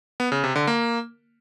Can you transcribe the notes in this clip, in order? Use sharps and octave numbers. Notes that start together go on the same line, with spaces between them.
B3
C#3
C3
D3
A#3